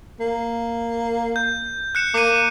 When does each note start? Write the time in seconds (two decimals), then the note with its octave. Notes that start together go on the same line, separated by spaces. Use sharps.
0.20 A#3
1.36 G6
1.95 F#6 C#7 E7
2.14 A#3 D6 D#7